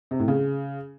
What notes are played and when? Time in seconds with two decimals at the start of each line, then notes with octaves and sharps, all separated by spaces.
0.11 C3
0.19 A2
0.28 C#3